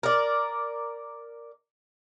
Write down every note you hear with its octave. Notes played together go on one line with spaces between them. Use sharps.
A#4 D5